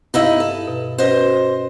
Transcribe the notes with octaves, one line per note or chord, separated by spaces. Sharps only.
G2 D#4 E4 D#5 F5 E6
A4
B2
C#4 F#4 B4 C5 D#5